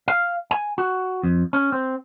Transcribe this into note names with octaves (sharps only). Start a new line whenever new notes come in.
F5
G#5
F#4
F2
C#4
C4